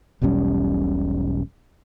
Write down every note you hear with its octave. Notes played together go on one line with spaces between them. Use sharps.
E1 B1 G3 C#4